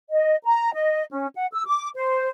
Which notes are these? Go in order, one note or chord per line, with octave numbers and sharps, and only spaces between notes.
D#5
A#5
D#5
C#4
F#5
E6
D6
C5